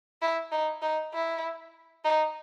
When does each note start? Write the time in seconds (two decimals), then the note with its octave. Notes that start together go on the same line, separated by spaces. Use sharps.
0.22 E4
0.52 D#4
0.82 D#4
1.14 E4
2.05 D#4